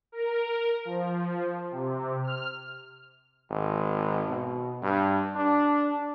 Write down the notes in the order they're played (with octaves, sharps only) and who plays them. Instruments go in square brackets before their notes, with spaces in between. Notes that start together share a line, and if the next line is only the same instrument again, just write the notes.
[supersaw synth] A#4
F3
C3
F6
[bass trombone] G#1
B2
G2
D4